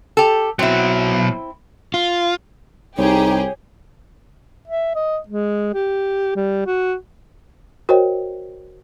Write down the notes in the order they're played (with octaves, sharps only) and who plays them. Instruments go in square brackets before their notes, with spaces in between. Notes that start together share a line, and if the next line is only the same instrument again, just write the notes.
[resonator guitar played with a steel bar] G4 A4
[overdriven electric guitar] B2 F#3 [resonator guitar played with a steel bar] C4 E4
[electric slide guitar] F4
[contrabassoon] C2 [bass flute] D#4 [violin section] G4 G#4 [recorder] C#5
[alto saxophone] E5
D#5
G#3
G4
G3
F#4
[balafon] F#4 A#4 C5 C#5 D#5 G5